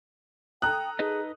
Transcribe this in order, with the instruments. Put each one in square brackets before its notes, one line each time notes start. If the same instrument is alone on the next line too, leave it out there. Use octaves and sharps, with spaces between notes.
[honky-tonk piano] A4 A#5 D#6 [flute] G5 [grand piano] F#6
[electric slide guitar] D#4 B4 D#5 [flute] G#4